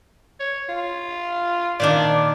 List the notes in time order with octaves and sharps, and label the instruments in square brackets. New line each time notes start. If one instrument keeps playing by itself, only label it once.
[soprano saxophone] C#5
F4
[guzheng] A#2 D#3 D4 [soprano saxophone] D5